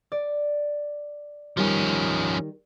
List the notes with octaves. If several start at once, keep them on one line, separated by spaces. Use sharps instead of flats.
D5
D#3 F3 G3 C#4